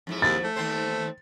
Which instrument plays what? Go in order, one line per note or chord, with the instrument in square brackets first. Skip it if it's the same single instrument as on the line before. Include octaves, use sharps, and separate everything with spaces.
[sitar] F2 G#2 E4
[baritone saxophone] D#2 [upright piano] A6
[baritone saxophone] A3
[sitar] D#2 C4 C5